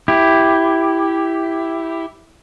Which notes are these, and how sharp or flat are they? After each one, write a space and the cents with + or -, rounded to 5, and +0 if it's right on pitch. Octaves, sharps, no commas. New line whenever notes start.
E4 +0 G4 +0